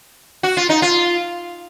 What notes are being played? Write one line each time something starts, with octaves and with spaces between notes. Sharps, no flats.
F#4
F4
D#4
F4